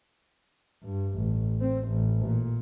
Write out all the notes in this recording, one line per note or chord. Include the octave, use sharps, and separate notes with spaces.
G2
A1
C4
A1
A#2